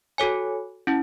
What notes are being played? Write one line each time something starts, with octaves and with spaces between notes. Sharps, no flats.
F#4 A4 C#5 G#5
C#4 E4